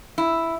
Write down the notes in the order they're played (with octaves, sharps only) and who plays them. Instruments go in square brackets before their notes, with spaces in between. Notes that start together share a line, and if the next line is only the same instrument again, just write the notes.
[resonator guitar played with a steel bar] E4